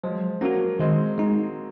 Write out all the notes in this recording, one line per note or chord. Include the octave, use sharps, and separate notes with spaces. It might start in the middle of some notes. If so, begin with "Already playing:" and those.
F3 F#3 G#3
F#3 A#3 C#4 F#4
D#3 G#3 C4
G#3 D#4